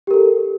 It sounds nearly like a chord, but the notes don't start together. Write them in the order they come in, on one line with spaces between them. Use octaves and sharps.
G4 A#4 A4